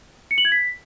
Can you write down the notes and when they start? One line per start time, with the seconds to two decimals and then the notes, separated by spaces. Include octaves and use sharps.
0.31 C#7
0.38 F#7
0.45 G#6
0.52 B6